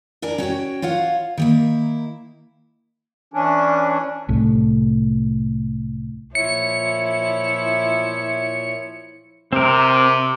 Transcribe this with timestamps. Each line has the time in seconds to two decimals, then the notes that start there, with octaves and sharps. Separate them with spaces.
0.22 D4 A#4 D5 G#5 A#5
0.38 C#4 F#4 C#5 G5
0.82 F4 C#5 F5 F#5
1.37 D#3 A#3 E4
3.34 E3 C#4 D4
4.29 C2 A2
6.35 A#2 F3 E4 C#5 E5 C#7
9.53 C3 C4 A#4